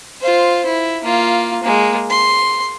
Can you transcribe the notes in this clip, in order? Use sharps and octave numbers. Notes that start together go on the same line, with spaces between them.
F4 C5
E4
A#3 F4
G#3 A#3
C6